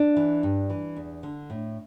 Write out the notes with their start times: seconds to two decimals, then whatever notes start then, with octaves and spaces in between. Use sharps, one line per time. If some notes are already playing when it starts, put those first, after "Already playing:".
Already playing: D4
0.16 E3
0.43 G2
0.70 E3
0.96 E2
1.23 D3
1.50 A2